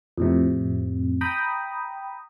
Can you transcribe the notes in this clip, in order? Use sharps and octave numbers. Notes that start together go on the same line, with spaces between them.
F2 A2 C3
G5 A#5 B5 D#6